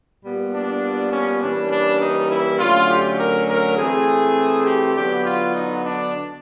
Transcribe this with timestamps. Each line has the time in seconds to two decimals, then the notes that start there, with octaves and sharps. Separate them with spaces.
0.23 A#2 G3 B3
0.54 D4
1.12 C#4
1.42 E3 G3 A#3 C#4 D4
1.71 D4
2.01 D#4
2.31 E4
2.60 D3 F#3 A3 C#4 F4
2.89 G4
3.18 A#4
3.49 A#4
3.77 E3 A3 C4 G#4
4.66 G4
4.96 D3 F#3 B3 G4
5.25 F4
5.55 D#4
5.83 D4